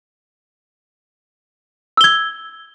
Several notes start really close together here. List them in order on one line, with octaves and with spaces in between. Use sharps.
E6 G7 G#6